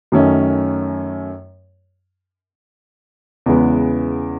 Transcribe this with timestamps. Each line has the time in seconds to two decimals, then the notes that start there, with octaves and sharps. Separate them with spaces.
0.12 F#2 D#3 A3 C#4
3.46 E2 C#3 E3 G#3 B3